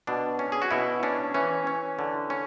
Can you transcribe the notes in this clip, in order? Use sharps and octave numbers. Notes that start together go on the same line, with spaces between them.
B2 D4
C#4
G#4
F#4
B2 E4
C#4 D4
E3 C#4
C#4
D3
C#4